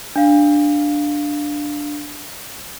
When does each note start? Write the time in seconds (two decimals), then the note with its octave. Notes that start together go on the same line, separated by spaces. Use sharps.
0.16 D4 F5